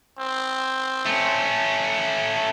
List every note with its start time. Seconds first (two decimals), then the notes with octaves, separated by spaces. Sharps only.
0.19 C4
1.06 A3 C#4